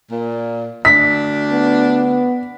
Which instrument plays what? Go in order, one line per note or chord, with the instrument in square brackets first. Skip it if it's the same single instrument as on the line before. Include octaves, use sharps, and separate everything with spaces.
[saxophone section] A#2
[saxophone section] D2 D4 [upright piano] B6
[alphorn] B3